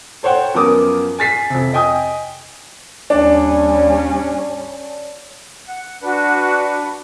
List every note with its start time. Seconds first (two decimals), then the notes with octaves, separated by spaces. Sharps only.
0.23 A4 C5 C#5 F#5 G5
0.55 F#2 F3 B3 A#4 D6 D#6
1.19 G#5 A6 B6 C7
1.50 F2 C3
1.73 D#5 G5 G#5 D#6
3.10 D#2 G3 C#4 D4 C#5 D5 A5
5.68 F#5
6.02 D4 F#4 B4